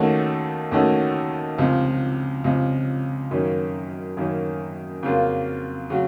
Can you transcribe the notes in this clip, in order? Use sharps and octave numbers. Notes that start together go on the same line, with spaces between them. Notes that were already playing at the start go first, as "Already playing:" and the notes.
Already playing: D#2 D#3 A3 C#4 F#4
D#2 D#3 A3 C#4 F#4
C#2 C3 F3
C#2 C3 F3
F#2 D#3 A#3 C#4
F#2 D#3 A#3 C#4
F2 C#3 F#3 A#3 F4
C#3 F#3